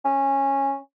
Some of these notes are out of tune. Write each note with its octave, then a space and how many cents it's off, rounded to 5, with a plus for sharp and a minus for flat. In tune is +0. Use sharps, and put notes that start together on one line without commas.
C#4 -15